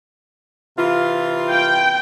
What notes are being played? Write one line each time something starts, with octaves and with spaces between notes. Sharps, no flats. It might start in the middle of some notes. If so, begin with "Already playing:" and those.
C3 E3 F4
G5